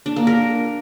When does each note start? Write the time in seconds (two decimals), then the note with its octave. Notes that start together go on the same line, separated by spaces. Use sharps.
0.06 D4
0.16 A#3
0.27 A#4